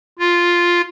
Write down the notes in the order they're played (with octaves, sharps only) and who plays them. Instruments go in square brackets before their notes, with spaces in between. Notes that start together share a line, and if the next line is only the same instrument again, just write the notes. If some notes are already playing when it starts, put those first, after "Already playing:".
[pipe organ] F4